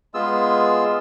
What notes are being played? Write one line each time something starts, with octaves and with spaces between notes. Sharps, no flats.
G#3 B3 F4 G#4 E6